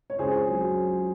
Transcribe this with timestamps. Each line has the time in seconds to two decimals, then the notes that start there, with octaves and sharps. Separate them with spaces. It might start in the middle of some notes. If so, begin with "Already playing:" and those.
0.10 C#5
0.18 C#2 G#4 C5
0.48 F#3